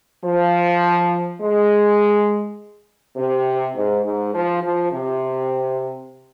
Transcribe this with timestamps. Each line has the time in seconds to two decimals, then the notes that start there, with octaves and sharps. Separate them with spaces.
0.25 F3
1.42 G#3
3.17 C3
3.76 G#2
4.05 G#2
4.34 F3
4.63 F3
4.92 C3